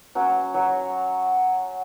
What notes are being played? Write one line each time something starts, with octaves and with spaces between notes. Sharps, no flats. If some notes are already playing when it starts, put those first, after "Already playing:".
F#3 C#4
F#3 C#5